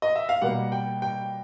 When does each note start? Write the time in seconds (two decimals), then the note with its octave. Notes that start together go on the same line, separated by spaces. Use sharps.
0.02 D#5
0.16 E5
0.29 F5
0.41 B2 G3 A#3 F#5
0.72 G5
1.02 G5